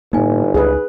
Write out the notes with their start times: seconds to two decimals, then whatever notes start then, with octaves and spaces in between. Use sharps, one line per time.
0.13 G1 A2 A#3 D#4 G#5
0.54 C#2 G#4 B4